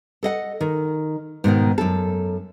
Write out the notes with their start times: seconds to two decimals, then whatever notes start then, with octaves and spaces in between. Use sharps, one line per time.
0.23 A4 D#5 F#5
0.61 D#3
1.44 G#2 B2 D3 D#3
1.78 F#2 A4